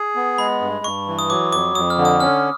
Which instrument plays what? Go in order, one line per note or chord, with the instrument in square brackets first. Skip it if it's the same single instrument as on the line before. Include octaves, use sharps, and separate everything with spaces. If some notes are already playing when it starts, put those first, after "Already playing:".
Already playing: [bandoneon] G#4
B3
[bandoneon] G#3 [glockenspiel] B5
[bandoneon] G2
[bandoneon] G2 [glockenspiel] C#6
[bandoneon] E3
[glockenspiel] D#6
[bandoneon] F#3 [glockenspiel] D6
[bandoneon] F2 [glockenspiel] D6
[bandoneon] F2 [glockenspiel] D#6
[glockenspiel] F6
[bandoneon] D3
[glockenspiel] D#6
[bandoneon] C#4 [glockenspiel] F6